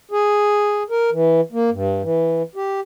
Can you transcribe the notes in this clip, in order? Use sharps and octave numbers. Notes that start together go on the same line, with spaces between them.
G#4
A#4
E3
A#3
G2
E3
G4